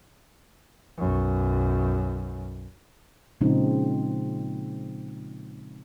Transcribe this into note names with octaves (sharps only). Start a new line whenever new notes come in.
B1 F#2
A#2 C#3 F3 G#3 C4 D#4